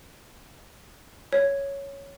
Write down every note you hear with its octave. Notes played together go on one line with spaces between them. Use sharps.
C#5